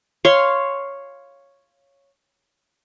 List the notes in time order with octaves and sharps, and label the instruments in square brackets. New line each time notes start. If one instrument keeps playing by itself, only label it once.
[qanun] C#5 F5 C6